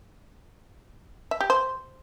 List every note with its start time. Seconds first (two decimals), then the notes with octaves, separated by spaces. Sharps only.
1.31 E5
1.41 G4
1.50 C5